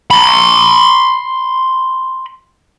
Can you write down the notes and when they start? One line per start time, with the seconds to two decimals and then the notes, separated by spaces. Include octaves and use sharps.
0.11 B5 C6